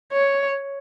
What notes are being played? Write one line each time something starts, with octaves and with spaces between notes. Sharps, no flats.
C#5